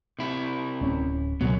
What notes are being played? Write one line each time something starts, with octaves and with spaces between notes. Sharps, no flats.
C3 E4
D1 C#4
C#2 F#2 B2 F#3 B3